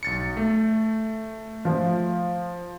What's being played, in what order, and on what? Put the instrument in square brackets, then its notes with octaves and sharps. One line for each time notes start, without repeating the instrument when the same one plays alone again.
[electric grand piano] B1 A6 C#7
A3
[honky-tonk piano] F3